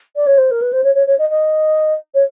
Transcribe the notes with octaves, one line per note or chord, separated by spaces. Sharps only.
D5
C#5
C5
A#4
B4
C5
C#5
C#5
C#5
D#5
D#5
C#5